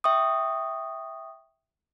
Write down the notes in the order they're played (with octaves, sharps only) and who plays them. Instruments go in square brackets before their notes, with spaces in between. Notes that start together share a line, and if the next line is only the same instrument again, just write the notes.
[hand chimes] E5 G5 C#6 D#6